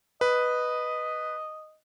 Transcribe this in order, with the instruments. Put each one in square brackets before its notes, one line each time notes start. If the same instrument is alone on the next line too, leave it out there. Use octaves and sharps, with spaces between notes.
[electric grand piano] B4 [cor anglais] D#5